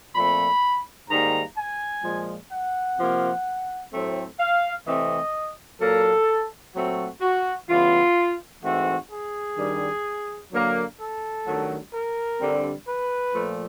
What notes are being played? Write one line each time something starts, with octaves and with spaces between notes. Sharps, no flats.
A#2 F3 A3 C4 B5
G#2 D#3 G3 A#3 A#5
G#5
A#2 F3 G#3
F#5
C3 F3 A#3
A2 F#3 A3 C4
F5
C3 E3 A3 C4 D#5
A#2 F#3 A#3 A4
A#2 F#3 A3 C4 F#4
F#4
C#3 E3 G3 B3 F4
G#2 E3 A3 C4 F#4
G#4
G2 D#3 G3
D3 F#3 A#3
A4
G2 D#3 F#3 A3
A#4
G2 D3 G3 C4
B4
A#2 F3 A3